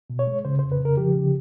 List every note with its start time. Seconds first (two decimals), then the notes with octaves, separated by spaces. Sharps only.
0.10 B2
0.19 C#5
0.27 G#3
0.45 C#3 C5
0.59 F2 C5
0.72 B4
0.80 C#3
0.85 A#4
0.97 F3 G4
1.15 C#3